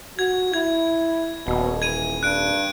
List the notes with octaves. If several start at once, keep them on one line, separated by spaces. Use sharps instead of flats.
F#4 G#6
E4 G#6
D#1 B2
E3 G#6 D#7
G2 F#6 D7